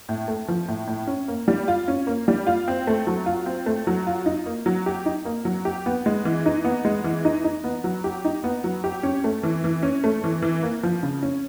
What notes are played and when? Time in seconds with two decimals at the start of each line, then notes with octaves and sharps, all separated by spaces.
0.09 A2
0.28 A3
0.48 F3
0.68 A2
0.87 A2
1.07 C#4
1.28 A#3
1.48 G3
1.68 F4
1.88 C#4
2.07 A#3
2.28 G3
2.47 F4
2.68 C4
2.87 A3
3.07 F#3
3.26 F4
3.46 C4
3.66 A3
3.87 F#3
4.07 F4
4.26 D#4
4.46 A#3
4.66 F#3
4.86 G4
5.06 D#4
5.25 A#3
5.45 F#3
5.65 G4
5.86 B3
6.06 G#3
6.25 E3
6.46 D#4
6.65 B3
6.85 G#3
7.04 E3
7.25 D#4
7.44 D#4
7.64 B3
7.84 F#3
8.04 G4
8.25 D#4
8.44 B3
8.64 F#3
8.84 G4
9.03 C#4
9.24 A3
9.43 E3
9.64 E3
9.83 C#4
10.04 A3
10.24 E3
10.42 E3
10.63 A#3
10.83 F3
11.03 C#3
11.23 C#4